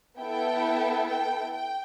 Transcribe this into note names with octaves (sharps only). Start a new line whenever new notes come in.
B3 E4 A4 G5
G5
G5